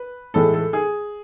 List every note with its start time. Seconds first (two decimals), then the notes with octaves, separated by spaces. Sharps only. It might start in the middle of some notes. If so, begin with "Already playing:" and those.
Already playing: B4
0.34 A2 E3 G#3 A4
0.54 A4
0.73 G#4